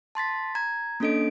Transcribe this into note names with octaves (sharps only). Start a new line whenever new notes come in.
A5 C6 A6 B6
A#5 G#6
A#3 C#4 D4 A4 D#5 D7